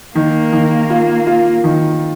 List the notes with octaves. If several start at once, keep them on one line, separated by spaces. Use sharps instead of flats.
D#3 A#3
D#3
F4
F4
D#3